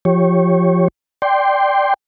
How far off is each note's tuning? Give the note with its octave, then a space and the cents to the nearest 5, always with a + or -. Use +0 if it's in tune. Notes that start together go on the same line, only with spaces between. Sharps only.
F3 +0 G4 -10 C#5 -15
D5 +0 G5 +0 C6 +0